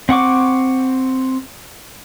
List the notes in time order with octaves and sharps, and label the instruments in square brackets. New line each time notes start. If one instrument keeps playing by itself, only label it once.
[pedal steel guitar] C4 F#5 C#6 D6